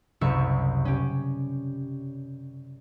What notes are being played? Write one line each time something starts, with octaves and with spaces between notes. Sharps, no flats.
F#1 C2 E5 C#6
C#4 G4